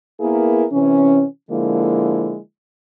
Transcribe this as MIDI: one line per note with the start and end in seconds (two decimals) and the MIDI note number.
0.21 0.65 58
0.21 0.65 59
0.21 0.65 64
0.21 0.65 68
0.21 0.65 70
0.72 1.24 48
0.72 1.24 52
0.72 1.24 61
1.51 2.38 50
1.51 2.38 53
1.51 2.38 56
1.51 2.38 58
1.51 2.38 64